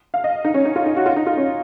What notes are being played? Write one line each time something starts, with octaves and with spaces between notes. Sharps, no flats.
F5
D#5
D#4
C#4
D#4
F4
D#4
F#4
F4
D#4
F4
C#4